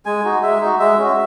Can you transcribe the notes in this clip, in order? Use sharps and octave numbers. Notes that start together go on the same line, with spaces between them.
G#3 G#5
D#4 F#4
G#3 E5
D#4 F#4
G#3 E5
C#4 F#4